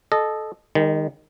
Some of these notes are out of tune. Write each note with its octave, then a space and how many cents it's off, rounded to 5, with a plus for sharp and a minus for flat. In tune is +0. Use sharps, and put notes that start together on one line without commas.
A4 -15 D#5 -20
D#3 +0 G#3 -40